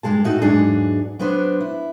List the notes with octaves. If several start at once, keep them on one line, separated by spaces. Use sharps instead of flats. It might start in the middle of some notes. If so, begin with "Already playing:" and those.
G2 B2 G#3 G#4 A5
A2 D#4 F#4
E2 G#2 F#3 D4 G#4
F#3 B3 D4 B4 C5
E4